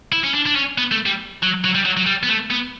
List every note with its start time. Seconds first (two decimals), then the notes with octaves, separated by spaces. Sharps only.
0.12 E4
0.23 C#4
0.34 D4
0.46 D4
0.55 C#4
0.78 B3
0.91 A3
1.06 G3
1.42 F#3
1.64 F#3
1.75 G3
1.85 F#3
1.97 F#3
2.06 G3
2.23 B3
2.29 A3
2.50 B3